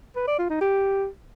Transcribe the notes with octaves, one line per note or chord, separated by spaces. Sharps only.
B4
D5
F4
D#4
G4